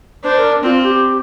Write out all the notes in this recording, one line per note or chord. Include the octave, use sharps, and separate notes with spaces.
D4 C5
A#4
C4 F4
G4